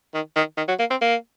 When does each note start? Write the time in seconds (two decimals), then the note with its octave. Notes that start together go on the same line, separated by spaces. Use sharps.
0.14 D#3
0.36 D#3
0.57 D#3
0.68 F#3
0.79 A#3
0.90 C4
1.01 A#3